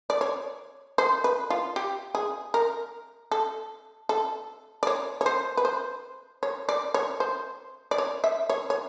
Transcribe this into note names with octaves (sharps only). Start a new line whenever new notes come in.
D5
C#5
C5
B4
F4
G4
G#4
A#4
A4
A4
D5
C#5
C#5
C5
B4
C5
C#5
D5
C#5
C5
D5
C#5
E5
C#5
C#5